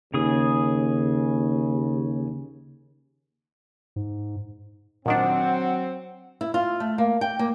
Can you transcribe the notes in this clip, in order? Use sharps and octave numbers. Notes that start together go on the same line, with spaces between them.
D#2 C#3 G#4 D#6
G#2
A#2 D#3 F#3 C4 D4 F#5
E4
F4
A3
A#3
G5
A#3